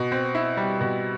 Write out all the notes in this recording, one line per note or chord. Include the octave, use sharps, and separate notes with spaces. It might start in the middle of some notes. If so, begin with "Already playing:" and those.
Already playing: B2
C4
E4
G3
B2